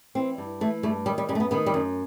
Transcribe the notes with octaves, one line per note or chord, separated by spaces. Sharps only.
E3 C4
G2
E3 A3
G2 A3
D#3 G3
G3
F#2 G3
A3
B3
D#3 B3
G3
F#2